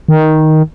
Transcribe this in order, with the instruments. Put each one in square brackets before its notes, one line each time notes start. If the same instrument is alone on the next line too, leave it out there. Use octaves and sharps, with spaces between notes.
[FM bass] D#3